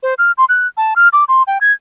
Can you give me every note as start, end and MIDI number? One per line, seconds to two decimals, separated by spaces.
0.03 0.14 72
0.18 0.32 89
0.38 0.45 84
0.49 0.67 90
0.77 0.94 81
0.96 1.09 89
1.13 1.24 86
1.29 1.43 84
1.47 1.58 79
1.61 1.72 92